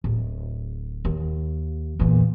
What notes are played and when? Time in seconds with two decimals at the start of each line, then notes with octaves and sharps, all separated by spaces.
0.04 D1
1.05 D#2
1.99 E2 A#2